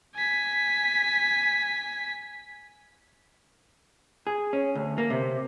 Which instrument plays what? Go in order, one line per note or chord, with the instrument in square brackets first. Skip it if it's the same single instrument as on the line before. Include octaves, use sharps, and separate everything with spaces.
[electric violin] G#5 B6
[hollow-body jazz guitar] G#4
C#4
D2
A#3
C3